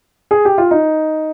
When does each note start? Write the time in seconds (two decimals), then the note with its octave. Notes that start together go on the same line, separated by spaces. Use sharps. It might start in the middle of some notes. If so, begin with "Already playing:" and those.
0.31 G#4
0.45 G4
0.58 F4
0.71 D#4